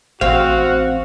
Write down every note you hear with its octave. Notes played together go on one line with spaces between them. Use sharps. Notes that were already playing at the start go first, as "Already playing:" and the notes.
A1 C4 F#4 F5